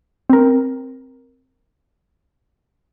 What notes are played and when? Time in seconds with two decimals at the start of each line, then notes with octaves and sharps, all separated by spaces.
0.30 C4 A#4